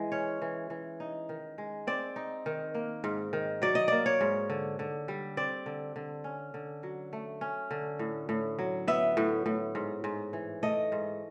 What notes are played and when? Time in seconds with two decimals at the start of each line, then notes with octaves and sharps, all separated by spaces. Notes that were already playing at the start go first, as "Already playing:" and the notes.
Already playing: E3 G#3
0.12 C#4 C#5
0.42 E3
0.70 E3
1.00 D#4
1.29 D#3
1.58 G#3
1.87 C4 D5
2.16 D#4
2.46 D#3
2.75 A#3
3.04 G#2
3.33 D#3
3.62 F#3 D5
3.75 D#5
3.88 A#3 D5
4.06 C#5
4.21 G#2
4.50 D3
4.79 D3
5.08 G3
5.37 C4 D5
5.66 D3
5.96 D3
6.24 C#4
6.54 D3
6.83 F#3
7.13 A3
7.41 C#4
7.71 D3
7.99 A2
8.29 A2
8.59 F#3
8.88 B3 E5
9.17 A2
9.46 A2
9.75 G#2
10.04 G#2
10.33 E3
10.63 A3 D#5
10.92 G#2